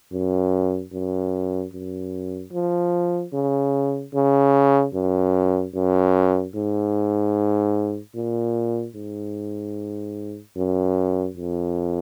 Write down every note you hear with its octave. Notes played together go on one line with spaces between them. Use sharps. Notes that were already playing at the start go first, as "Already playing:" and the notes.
F#2
F#2
F#2
F3
C#3
C#3
F#2
F#2
G#2
A#2
G#2
F#2
F2